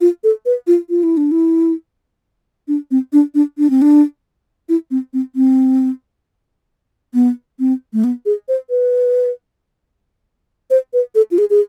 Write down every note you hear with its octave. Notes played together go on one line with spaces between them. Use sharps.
F4
A4
B4
F4
F4
E4
D4
E4
D4
C4
D4
D4
D4
C4
D4
E4
C4
C4
C4
B3
C4
A3
B3
G#4
C5
B4
C5
B4
A4
F4
G#4
G#4